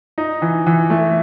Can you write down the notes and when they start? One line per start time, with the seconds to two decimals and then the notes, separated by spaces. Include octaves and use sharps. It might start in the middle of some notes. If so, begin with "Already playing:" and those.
0.18 D#4
0.42 E3
0.66 E3
0.90 A3